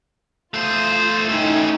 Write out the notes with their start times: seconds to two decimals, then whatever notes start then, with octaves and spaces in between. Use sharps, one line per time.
0.54 A3 F4 C5 D#6
1.29 A3 C#4 D#4 E4 G5